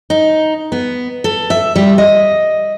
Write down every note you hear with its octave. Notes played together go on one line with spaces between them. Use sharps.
D#4
B3
A4
E5
G3
D#5